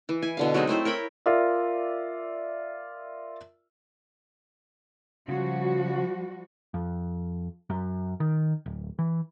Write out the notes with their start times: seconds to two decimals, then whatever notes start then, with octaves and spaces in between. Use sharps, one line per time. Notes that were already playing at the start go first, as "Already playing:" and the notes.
0.09 E3
0.22 E4 G#5
0.37 B2 D3 F5
0.54 F#3 G#3 C4 D#4
0.67 A3 C4 E4 C5
0.85 A#4 C#5 G5 B5
1.26 F4 A#4 D5 E5
5.29 C#3 F3 G3 F#4
6.74 F2
7.70 F#2
8.20 D#3
8.66 D1
8.99 E3